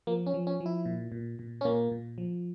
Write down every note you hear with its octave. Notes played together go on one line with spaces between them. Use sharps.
F3 A#3
C#4
F3
C#4
F3
E4
A#2
A#2
A#2
C#4
A#2 A#3
A#2
F3